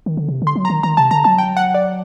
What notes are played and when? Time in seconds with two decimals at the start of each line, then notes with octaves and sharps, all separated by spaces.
0.06 D#3
0.17 D3
0.29 C3
0.42 D3
0.47 C6
0.56 F#3
0.65 A#5
0.70 D#3
0.83 D#3 A#5
0.97 C3 A5
1.11 D3 A#5
1.24 F#3 A5
1.38 G5
1.57 F#5
1.74 D5